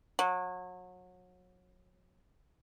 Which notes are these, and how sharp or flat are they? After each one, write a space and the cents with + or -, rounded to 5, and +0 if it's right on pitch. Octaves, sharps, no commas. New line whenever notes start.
F#3 -30